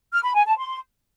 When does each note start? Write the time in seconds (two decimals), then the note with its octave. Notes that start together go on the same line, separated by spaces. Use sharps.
0.12 F6
0.23 B5
0.35 G#5
0.46 A5
0.57 C6